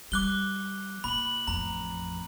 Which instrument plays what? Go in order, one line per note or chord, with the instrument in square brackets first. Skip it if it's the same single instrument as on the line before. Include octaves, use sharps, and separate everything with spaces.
[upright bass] G3 [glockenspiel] D6 F#6 G7
[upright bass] A#2 [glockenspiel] B5 F#7
[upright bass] A1 F2 [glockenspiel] A#5